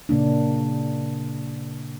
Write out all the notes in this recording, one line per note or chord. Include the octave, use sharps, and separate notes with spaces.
A#2 C#3 A#3 D4